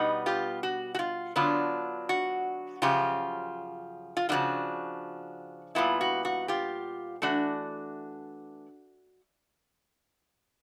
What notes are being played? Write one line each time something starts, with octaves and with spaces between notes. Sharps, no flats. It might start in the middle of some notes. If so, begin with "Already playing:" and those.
Already playing: B2 G3 B3 D#4
F4 G4
F#4
F#4
F4
D3 F#3 B3 D4 F4
F#4
F#2 C#3 F3 F4 G4
F4
C#3 F3 A#3 D4 F4 F#4
A#2 G3 B3 E4 F4
F#4
F#4
F4 G4
E3 A3 D4 F#4